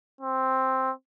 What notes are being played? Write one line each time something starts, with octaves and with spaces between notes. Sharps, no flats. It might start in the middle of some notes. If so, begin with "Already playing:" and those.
C4